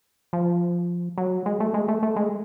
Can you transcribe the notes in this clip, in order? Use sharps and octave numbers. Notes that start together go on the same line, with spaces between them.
F3
F#3
G#3
A3
G#3
A3
A3
G#3